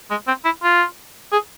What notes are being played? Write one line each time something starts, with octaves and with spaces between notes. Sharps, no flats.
G#3
C4
E4
F4
G#4